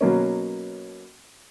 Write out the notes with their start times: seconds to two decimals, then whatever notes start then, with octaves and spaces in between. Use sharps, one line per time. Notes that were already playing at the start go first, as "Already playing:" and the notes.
0.01 B2 F#3 A#3 C#4